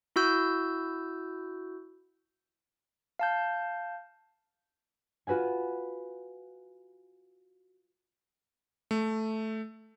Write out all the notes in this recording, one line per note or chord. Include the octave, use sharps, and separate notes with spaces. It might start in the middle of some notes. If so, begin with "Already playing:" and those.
E4 F#4 E6 G6
F5 A5 G6
F4 F#4 B4 F#5 G#5
A3